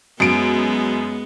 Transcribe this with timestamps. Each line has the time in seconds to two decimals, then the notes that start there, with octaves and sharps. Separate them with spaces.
0.20 F#2 G#3 B3 D7